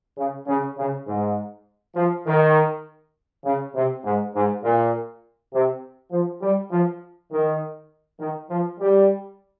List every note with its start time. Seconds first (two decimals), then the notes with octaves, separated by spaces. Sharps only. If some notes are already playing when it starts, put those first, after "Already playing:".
0.17 C#3
0.47 C#3
0.78 C#3
1.07 G#2
1.96 F3
2.26 D#3
3.44 C#3
3.75 C3
4.04 G#2
4.34 G#2
4.63 A#2
5.53 C3
6.11 F3
6.41 G3
6.71 F3
7.31 D#3
8.19 D#3
8.49 F3
8.79 G3